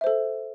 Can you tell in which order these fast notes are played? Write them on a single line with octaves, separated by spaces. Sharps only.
E5 C5 A4